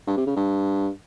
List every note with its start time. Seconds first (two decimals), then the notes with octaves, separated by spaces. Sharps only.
0.07 G2
0.17 C3
0.27 C#3
0.36 G2